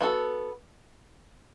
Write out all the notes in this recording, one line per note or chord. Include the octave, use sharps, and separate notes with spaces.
B3 F#4 A4